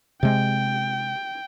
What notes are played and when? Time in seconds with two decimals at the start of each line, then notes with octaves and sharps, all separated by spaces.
0.23 C3 G#3 G5